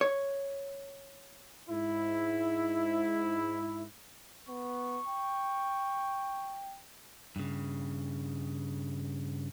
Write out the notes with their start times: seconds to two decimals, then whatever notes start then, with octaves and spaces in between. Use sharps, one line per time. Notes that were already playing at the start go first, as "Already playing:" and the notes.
0.01 C#5
1.70 G#2 E4
4.49 B3 C#6
5.08 G5
7.36 G2 C#3